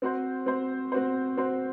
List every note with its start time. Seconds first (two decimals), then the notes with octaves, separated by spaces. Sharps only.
0.02 C4 F#4 C5
0.46 C4 F#4 C5
0.92 C4 F#4 C5
1.37 C4 F#4 C5